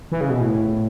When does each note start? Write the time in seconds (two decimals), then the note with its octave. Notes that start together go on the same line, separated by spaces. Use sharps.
0.12 E3
0.21 C#3
0.30 B2
0.40 A2